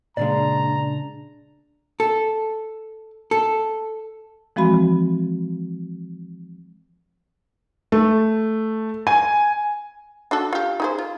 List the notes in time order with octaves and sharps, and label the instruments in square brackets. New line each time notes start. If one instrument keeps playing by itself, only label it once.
[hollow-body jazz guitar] A#2 C#3 G#3 [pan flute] D4 [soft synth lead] D5 [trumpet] A#5
[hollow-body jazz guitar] A4
A4
[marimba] E3 F3 G#3 C4 F#4 B5
[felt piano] A3
G#5
[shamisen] D4 F#4 A4
F4 G4
D#4 G#4 C5
F4